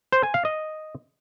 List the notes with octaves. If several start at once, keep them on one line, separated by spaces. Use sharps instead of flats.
C5
G#5
F5
D#5